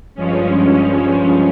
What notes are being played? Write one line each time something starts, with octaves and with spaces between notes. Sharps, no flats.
G2 F3 G#3 C#4